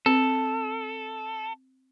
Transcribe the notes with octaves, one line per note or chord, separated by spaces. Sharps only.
C4 A4